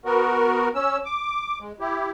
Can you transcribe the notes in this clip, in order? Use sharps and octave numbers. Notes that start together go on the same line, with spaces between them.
B3 F#4 A#4
C#4 E6
D6
G#3
E4 G4